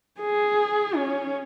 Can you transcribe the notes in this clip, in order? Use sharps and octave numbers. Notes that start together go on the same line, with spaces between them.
G#4
C#4